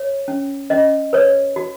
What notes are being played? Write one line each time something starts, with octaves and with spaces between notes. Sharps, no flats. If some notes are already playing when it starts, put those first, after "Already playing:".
Already playing: C#5
C#4
C#4 D#5
B4 C#5
F#4